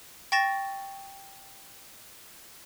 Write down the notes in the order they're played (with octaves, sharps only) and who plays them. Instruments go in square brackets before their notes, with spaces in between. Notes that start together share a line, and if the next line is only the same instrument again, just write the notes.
[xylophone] G5 C#6 A6 A#6 E7